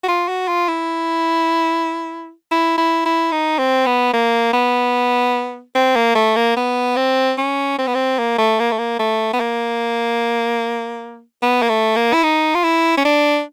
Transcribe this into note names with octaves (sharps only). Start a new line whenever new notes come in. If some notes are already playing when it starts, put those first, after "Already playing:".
F#4
F4
F#4
F4
E4
E4
E4
E4
D#4
C4
B3
A#3
B3
C4
A#3
A3
A#3
B3
C4
C#4
C4
B3
C4
A#3
A3
A#3
A3
A#3
A3
B3
A#3
B3
A#3
A3
A#3
E4
D#4
F4
E4
C#4
D4